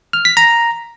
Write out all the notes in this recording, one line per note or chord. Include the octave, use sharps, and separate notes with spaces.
F6
B6
A#5